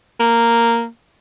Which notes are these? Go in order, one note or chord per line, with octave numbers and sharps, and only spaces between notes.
A#3